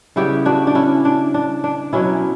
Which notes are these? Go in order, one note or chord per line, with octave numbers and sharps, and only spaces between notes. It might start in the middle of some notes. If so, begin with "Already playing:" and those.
C#3 G3 B3 E4 G4
D4 F#4
D4
C#4 E4
D4
D4
D4
B2 F#3 B3 C#4 E4